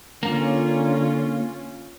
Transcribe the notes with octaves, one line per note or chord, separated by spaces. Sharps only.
D3 A#3 C#4 F4